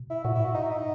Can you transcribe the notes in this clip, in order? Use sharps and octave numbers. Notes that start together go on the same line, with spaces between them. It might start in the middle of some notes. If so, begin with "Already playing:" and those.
Already playing: B2
E4
A#2 F#4
E4
G#2 F#4
D#4
E4
D#4